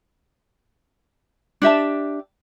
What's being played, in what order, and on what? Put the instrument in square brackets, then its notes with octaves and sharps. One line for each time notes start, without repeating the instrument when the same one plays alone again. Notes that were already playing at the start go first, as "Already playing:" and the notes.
[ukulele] D4 G4 E5 A5